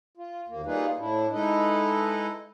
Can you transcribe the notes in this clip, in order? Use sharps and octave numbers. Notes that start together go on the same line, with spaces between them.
F4
D#2 A#3
G3 A#3 D#4 F4 G#4 B4
A2 D4 E4
G#3 D#4 E4 A4 B4 D#5